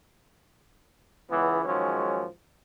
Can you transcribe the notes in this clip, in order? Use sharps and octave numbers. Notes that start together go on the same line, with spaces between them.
C#2 E3 B3
G#2 D#3 F3 F#3 G#3 C#4